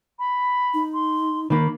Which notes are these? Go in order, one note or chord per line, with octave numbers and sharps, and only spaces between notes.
B5
D#4
C6
D#3 A#3 B5